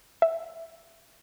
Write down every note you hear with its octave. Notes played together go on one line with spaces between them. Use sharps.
E5